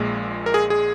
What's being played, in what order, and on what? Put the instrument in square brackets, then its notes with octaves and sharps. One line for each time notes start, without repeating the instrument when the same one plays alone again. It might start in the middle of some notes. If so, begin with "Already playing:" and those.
Already playing: [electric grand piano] A#1 A#2 G#3
A#4
G#4
G#4